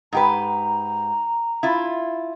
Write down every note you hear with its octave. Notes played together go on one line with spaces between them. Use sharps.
G#2 G4 B4 A#5
E4 F4